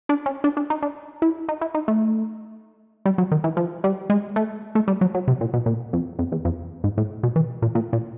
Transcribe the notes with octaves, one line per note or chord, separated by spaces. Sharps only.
D4
C#4
D4
D4
D#4
D4
E4
D#4
E4
D#4
A3
G3
F#3
D#3
E3
F3
G3
G#3
A3
A3
G3
F#3
F#3
C3
A#2
B2
A#2
F2
F2
E2
F2
G#2
A2
B2
E3
A#2
A#2
A#2